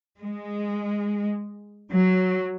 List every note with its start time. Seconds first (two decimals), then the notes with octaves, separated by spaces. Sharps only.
0.21 G#3
1.92 F#3